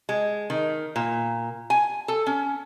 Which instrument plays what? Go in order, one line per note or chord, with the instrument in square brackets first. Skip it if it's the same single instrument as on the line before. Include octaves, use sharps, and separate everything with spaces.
[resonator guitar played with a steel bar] G#3
D#3
A#2
G#5
A4
C#4